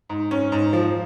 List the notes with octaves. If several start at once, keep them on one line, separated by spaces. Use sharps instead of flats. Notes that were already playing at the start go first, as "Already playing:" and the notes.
G#2
G#2 C#4
G#2
F3